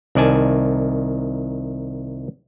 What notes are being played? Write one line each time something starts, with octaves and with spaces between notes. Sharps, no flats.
C2 D#3 D5 G#5 A5